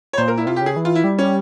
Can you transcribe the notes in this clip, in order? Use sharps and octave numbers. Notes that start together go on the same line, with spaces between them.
C#5
A#2 C5
A#4
E4
C3 F4
C#3 G4
G#4
E3
F4
E4
G3
C#4